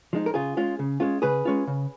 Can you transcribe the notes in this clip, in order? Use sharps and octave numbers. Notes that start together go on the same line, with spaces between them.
F3 G#3 D#4
A#4
C#3 F4 G#4
G#3 C#4 F4
C#3
G#3 C#4 F4
C#3 G#4 B4
G#3 C#4 F4
C#3